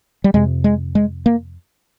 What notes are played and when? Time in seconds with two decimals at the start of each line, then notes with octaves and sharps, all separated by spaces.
0.24 G3
0.34 F2 C3 G#3
0.64 G#3
0.95 G#3
1.26 A#3